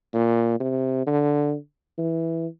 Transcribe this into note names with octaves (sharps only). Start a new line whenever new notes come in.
A#2
C3
D3
E3